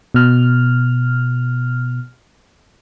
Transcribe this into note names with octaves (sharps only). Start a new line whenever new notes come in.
B2 F6